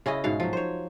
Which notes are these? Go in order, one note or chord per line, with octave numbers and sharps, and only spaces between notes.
C#3 C#4 E4 D#5
G#2 B2 F5
F3 F#3
C5 C#5